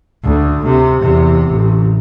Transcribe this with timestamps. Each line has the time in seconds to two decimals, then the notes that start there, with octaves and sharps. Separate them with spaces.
0.23 D2
0.66 C3
1.02 E2 C3
1.49 A1